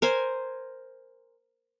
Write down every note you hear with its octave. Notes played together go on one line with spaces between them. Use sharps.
A#4 C5 G#5